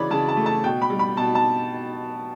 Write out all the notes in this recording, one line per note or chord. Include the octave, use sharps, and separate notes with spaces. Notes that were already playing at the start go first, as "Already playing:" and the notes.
Already playing: C#3 E3 C#5 D5 B5
C#3 A5
A5
A3
A5
B2 G5
B5
G3
B5
B2 A5
A5